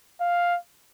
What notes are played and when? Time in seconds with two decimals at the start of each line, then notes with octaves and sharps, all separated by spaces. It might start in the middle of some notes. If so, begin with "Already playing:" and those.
0.21 F5